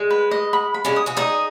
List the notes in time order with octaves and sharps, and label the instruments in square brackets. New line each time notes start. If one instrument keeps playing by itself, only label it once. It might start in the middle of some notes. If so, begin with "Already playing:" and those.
Already playing: [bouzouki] G#3
[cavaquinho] B4
D#5
B5
B5
[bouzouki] G#3 C#4
[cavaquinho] D#6
[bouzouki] C#4 F#4
[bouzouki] D#4 G#4 [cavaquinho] D#6